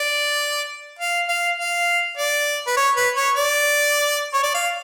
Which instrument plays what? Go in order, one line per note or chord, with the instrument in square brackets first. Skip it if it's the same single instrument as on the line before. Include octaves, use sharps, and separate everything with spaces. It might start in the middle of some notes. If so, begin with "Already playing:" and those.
Already playing: [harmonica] D5
F5
F5
F5
D5
B4
C#5
B4
C#5
D5
C#5
D5
F5